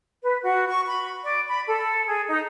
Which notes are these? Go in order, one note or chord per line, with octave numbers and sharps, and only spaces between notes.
B4
F#4
C#6
B5
D5
B5
A4
G#4
D#4